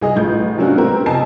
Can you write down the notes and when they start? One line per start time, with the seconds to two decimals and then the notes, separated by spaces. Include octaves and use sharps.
0.01 C2 G#4 D#5
0.16 A1 F3 G6
0.58 F#3 A#3 C#4 D4 F4 F#4
0.78 G#3 A3 B3 C4 G4 A#4
1.06 F2 C3 D#5 G#5 A5 C7